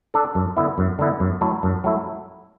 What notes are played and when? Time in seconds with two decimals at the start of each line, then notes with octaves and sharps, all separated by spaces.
0.14 D4 A4
0.35 F#2
0.57 D3 B3 E4
0.78 F#2
0.99 D3 B3 E4
1.20 F#2
1.41 F#3 A3 E4 A4
1.63 F#2
1.84 F#3 A3 E4